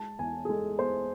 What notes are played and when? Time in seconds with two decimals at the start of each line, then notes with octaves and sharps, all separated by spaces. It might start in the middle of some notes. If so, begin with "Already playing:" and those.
Already playing: G#3 A5
0.19 E2 G#5
0.45 G#4
0.49 G#3 A4
0.79 B3 C5